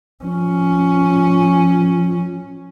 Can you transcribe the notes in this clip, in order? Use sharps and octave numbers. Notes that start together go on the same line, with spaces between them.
F3 C#4